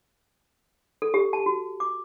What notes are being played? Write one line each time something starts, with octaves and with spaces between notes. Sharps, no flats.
A4
G4
A5
F#4
D6